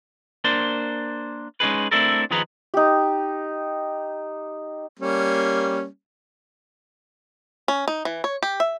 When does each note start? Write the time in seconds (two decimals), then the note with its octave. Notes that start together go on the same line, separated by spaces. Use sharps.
0.44 A#3 D4 C5
1.60 G#3 C#4 D#4 G#4 B4
1.91 A3 C4 D4 E4 A4 A#4
2.31 D#3 F3 D#4 G#4 B4 A#5
2.74 D#4 G4
4.99 G3 A#3 C#4
7.68 C#4
7.88 D#4
8.05 E3
8.24 C#5
8.43 G4
8.60 E5